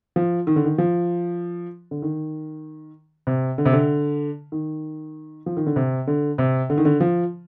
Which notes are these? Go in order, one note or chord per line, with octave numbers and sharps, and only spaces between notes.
F3
D#3
D3
D#3
F3
D3
D#3
C3
D3
C3
D3
D#3
F3
D#3
D3
C3
D3
C3
D3
D#3
D3
F3